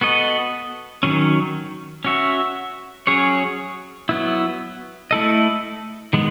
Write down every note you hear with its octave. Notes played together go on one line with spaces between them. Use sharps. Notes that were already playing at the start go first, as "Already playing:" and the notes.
B3 F#4 A4 D#5
D#3 F#3 C#4
C#4 F#4 C#5 E5
F#3 C#4 G#4 C#5
F#3 B3 E4
A3 E4 A4 D#5
D#3 G#3 B3